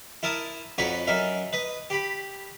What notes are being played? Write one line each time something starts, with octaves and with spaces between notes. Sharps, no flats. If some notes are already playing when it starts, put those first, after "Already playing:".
E4 A#4 A5 D#6
F2 D#4 F#4 C#5 B5 C#6
F#2 D#4 A#4 E5
B4 D#5
G4 B5